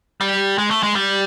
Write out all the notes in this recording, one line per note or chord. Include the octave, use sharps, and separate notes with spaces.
G3
G#3
A3
G#3
G3